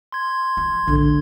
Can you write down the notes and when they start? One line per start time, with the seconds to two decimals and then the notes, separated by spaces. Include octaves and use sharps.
0.12 C6 G#6
0.57 F3
0.88 A#1 A2 D3